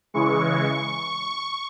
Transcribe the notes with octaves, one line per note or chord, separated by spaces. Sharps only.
C#3 E3 G#3 C#6